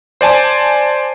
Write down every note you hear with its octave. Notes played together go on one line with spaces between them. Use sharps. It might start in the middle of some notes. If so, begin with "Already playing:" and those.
C5 D5 G#5 A5